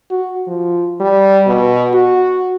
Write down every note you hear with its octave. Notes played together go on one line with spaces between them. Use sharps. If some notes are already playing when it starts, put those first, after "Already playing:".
F#4
F3
G3
B2
F#4